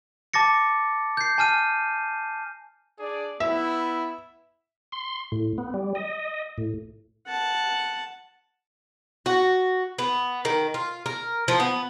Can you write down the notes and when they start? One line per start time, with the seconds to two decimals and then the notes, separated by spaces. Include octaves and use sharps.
0.34 A5 D6 A6 A#6 C#7
1.17 G6 C7
1.38 G#5 A5 F6 D#7
3.00 D4 G#4 D5
3.40 B3 E4 E5
4.92 C6
5.32 A2
5.58 B3
5.74 G3
5.95 D#5
6.58 A2
7.27 F#5 A5
9.26 F#4
9.99 B3
10.45 D#3
10.74 F4
11.06 A#4
11.48 F3
11.60 B3